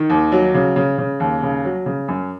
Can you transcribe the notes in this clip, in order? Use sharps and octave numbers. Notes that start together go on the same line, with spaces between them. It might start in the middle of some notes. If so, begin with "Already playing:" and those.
Already playing: D#3
D#2
F#3
C#3
C#3
C#3
D#2
C#3
F#3
C#3
F#2